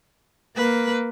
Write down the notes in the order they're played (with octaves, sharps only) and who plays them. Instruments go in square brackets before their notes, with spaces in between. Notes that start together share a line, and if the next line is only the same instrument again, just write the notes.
[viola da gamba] A#3 [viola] B4